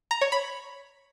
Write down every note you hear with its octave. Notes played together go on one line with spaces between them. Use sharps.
A#5
C#5
B5